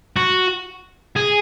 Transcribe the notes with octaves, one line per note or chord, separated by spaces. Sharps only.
F#4
G#4